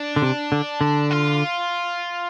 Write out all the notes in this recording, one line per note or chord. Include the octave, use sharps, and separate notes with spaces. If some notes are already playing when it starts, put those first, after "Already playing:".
Already playing: D4
D3
C3
D3
D3
F4